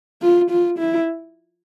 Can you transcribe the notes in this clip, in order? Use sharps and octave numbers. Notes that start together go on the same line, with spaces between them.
F4
F4
E4